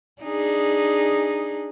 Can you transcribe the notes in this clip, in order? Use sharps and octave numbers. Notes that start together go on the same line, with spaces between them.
D4 D#4 G#4